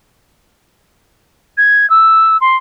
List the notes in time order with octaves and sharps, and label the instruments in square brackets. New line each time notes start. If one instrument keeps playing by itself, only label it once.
[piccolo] G#6
E6
C6